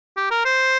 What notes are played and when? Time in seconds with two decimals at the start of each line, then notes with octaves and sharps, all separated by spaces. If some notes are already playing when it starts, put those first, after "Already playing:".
0.17 G4
0.31 A#4
0.45 C5